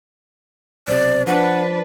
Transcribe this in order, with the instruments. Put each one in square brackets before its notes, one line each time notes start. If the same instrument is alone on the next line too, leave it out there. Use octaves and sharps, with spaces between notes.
[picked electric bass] B1 C3 [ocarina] C5 [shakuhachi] D5
[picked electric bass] F3 [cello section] D4 B4 [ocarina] C5 [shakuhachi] F#5